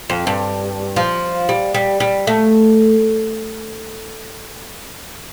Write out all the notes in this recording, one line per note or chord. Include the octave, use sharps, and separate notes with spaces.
F2
G2
F3
G3
G3
G3
A3